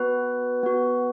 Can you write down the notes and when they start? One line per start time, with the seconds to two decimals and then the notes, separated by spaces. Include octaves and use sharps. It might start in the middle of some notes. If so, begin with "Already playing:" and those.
Already playing: B3 F#4 B4
0.63 B3 F#4